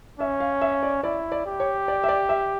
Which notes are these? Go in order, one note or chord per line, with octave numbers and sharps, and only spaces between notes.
C#4 E5
F5
E5
D5
E4 D5
D5
G4
C#5
D5
E5
D5
E5